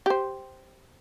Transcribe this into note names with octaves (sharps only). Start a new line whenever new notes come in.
G4 C5